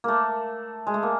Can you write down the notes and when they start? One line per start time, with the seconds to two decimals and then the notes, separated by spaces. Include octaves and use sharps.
0.04 A3 A#3
0.87 G#3
0.94 A3
1.03 A#3